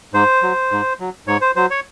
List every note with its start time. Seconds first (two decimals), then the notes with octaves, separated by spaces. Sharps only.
0.14 G#2 C5
0.43 F#3
0.71 G#2
1.00 F#3
1.27 G#2 C#5
1.41 C5
1.56 F#3 C5
1.70 C#5